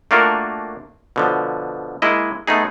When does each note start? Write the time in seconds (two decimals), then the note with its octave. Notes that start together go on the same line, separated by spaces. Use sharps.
0.11 A3 A#3 D4 F4 F#4 A#4
1.16 B2 D3 F3
2.02 G#3 A#3 E4 D#5
2.47 A3 B3 D#4 G#4